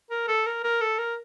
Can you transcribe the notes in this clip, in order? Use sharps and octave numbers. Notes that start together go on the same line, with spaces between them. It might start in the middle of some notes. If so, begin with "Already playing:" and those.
A#4
A4
A#4
A#4
A4
A#4